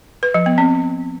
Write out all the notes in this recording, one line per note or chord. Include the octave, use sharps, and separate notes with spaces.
B4
F3
B3
C4